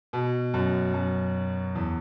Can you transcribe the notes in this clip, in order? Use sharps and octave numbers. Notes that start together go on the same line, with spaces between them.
B2
F#2
F#2
E2